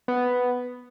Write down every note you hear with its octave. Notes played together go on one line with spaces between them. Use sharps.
B3